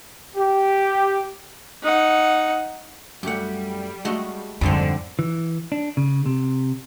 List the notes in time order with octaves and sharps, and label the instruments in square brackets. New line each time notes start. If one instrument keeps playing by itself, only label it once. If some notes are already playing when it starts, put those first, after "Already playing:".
[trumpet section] G4
[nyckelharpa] D#4 F#5
[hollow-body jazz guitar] F#2 A3 [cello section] G3 [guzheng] G4 F#5
[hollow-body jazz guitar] G#3 [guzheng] A3 F#4 D#5
[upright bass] F2 [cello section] G#2 D3 [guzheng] G3 A3 C4
[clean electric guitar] E3
D4
C#3
C3